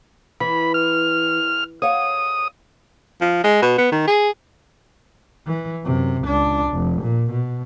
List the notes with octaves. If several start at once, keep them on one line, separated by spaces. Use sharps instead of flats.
E3 B5
F6
C#5 F5 F#5 D#6
F3
G#3
B2
B3
D#3
G#4
E3
F#2 C3
C#2 D4
F1
A#2
B2